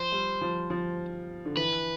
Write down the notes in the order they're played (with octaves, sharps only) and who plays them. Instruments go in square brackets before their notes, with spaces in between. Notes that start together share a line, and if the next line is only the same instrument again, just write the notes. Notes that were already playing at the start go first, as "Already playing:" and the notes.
Already playing: [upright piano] F3 [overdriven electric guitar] C5
[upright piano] G3
F3
F3
D3
[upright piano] E3 [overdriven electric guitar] B4